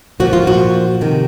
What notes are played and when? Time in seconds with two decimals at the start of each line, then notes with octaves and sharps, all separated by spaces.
0.20 A#2 F3 F#4
0.33 F4
0.47 F#4
1.01 C3 D#3